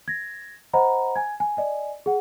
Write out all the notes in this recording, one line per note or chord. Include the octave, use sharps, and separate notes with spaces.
G#6 A#6
C5 D#5 F#5 A#5 B5
G#5 G#6
G#5
D5 D#5 G#5
G#4 F#5